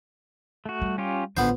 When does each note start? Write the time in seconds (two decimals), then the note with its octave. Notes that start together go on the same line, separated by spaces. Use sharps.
0.66 A3 F#4
0.82 G3
0.98 C#4 F4 G4
1.37 A1 D3 B3 F4 C5